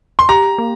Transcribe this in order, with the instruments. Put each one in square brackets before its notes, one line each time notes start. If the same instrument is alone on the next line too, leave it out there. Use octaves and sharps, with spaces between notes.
[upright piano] C6
[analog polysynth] G4 [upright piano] A#5
[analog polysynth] A#3